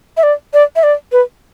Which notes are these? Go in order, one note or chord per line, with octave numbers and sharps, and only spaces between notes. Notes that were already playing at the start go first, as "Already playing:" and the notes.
E5
D5
D5
E5
D5
B4